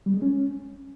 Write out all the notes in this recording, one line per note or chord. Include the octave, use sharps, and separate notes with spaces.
G3
G#3
C#4